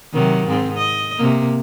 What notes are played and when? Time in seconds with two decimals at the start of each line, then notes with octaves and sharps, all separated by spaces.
0.13 C3 D#3 F#3
0.47 G#2 C4
0.78 D#5
1.17 C3 A#3